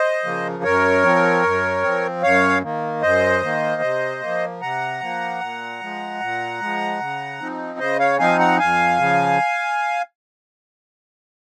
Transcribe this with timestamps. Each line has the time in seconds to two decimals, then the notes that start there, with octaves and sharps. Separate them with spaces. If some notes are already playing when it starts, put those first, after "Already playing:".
Already playing: C5 D#5
0.24 C#3 F3 A#3
0.64 F#2 A#4 C#5
1.03 F3 C4
1.44 F#2
1.83 F3 C4
2.23 F#2 C#5 F5
2.63 D#3 A#3
3.02 F#2 C5 D#5
3.42 D#3 A#3
3.82 C3
4.21 F3 A#3
4.61 C3 F#5 A#5
5.01 F3 A#3
5.41 A#2
5.80 F3 G#3
6.20 A#2
6.60 F3 G#3
7.00 C#3
7.40 F3 C4 D#4
7.79 C#3 C5 D#5
7.99 C#5 F5
8.19 F3 C4 D#4 F5 G#5
8.39 F#5 A#5
8.59 F2 F5 G#5
8.99 C#3 F3